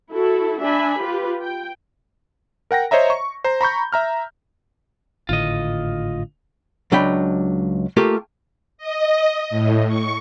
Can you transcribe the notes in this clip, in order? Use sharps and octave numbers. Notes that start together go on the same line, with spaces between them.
E4 F#4 A4
D4 E5 G#5 B5
F4 G4 B4
G5
A#4 F#5 G5 A#6
C5 C#5 D#5 E5 A#5
C#6
C5 A#5
A#5 B5 C#6 G6
E5 A#5 F6
G#1 A2 D3 F4 D#5
C#2 F#3 D4 F#5 G5 B5
A3 A#3 F4 G4 A#4
D#5
A2
C#6